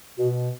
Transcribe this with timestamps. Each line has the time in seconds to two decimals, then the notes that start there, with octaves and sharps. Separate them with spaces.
0.18 B2 F#4